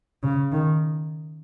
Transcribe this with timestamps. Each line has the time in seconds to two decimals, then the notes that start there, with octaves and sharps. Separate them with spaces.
0.23 C#3
0.52 D#3